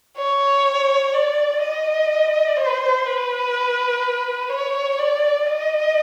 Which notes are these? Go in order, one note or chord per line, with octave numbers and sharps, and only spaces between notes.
C#5
D5
D#5
C5
B4
C#5
D5
D#5